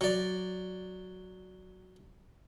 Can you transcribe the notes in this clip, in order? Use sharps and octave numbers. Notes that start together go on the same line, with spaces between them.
F#3 D5